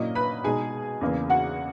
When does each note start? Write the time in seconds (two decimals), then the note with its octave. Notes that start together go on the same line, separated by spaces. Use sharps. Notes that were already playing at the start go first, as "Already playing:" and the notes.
Already playing: A#2 F#3 A#3 C#4 E4 D#5
0.15 B4 B5
0.44 B2 G#3 D#4 G#4 G#5
1.01 E2 C#3 E3 A#3
1.30 F#4 F#5